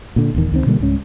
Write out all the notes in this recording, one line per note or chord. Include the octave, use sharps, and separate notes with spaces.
A#2 D3
D#1 E2 D#3
C#2 D#3 C4
B2 D3 G3 A#3
C#2 G#2 C#4